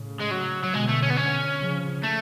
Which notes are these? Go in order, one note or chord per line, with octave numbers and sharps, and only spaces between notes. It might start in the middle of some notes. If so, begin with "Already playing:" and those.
Already playing: A2 C#3
G#3
F#3
F#3
B2 D3 G#3
A3
C#4
B3
C#4
C#3 F3
A3